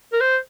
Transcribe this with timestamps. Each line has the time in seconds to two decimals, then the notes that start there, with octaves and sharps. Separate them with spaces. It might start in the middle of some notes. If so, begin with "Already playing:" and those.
0.13 A#4
0.20 C5